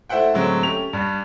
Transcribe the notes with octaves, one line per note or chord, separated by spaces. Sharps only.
A3 E4 C5 E5 F#5 G5
A2 D3 F#3 G#3 C4
A3 C#4 G4 F7
G2 G3